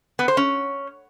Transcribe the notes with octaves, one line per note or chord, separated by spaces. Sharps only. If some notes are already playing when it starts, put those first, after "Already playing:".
B3
C5
C#4